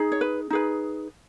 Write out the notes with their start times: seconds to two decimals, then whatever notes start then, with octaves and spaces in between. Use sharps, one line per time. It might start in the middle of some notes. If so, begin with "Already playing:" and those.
Already playing: D#4 G#4
0.12 C#5
0.21 B4
0.50 D#4 G#4 B4